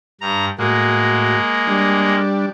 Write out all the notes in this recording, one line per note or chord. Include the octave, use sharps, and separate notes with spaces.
G2 A#5
A2 G#3 A#3 F#4
G3 D4